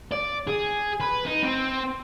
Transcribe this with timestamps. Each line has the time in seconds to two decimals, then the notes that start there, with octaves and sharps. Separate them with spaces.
0.11 D5
0.47 G#4
1.00 B4
1.26 D#4
1.42 C4